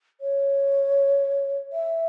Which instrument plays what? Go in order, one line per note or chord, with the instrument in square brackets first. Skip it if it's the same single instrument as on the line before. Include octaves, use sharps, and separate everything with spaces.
[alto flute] C#5
E5